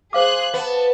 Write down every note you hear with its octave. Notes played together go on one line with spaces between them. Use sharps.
G#4 C5 F5 C6 D6 F#6
B3 A5